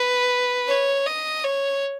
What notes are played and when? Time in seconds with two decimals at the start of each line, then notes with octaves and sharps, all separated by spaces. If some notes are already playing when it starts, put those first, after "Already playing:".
Already playing: B4
0.68 C#5
1.06 D#5
1.44 C#5